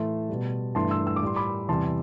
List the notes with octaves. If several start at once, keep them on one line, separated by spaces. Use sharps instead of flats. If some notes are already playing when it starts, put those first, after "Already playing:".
Already playing: A2 E3 A3 A5 C6
B2 G3
G2 E3 A3 A5 C6
C6 E6
E6
D6
A2 G3 C6
B5 D6
E2 C3 G3 A5 C6